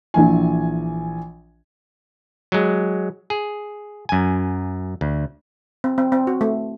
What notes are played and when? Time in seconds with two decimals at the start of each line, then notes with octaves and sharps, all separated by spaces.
0.14 A#1 E3 G#5
2.52 F#3 G#3
3.30 G#4
4.09 F#2 G#5
5.01 D2
5.84 C4
5.98 C4
6.12 C4
6.27 F#4
6.41 A3